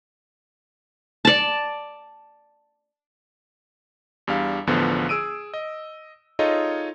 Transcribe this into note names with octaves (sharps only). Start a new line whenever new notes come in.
D5 A5
E2 G3 D4 F5
A1 E2 D3 F3 B3
G#4 E6 D7 D#7
D#5
D#4 F4 G#4 A4 C#5 D#5